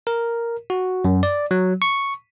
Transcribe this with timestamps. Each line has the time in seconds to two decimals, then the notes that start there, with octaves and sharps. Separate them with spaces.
0.07 A#4
0.70 F#4
1.05 F#2
1.23 D5
1.51 F#3
1.82 C#6